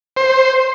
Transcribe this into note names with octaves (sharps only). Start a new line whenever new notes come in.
C5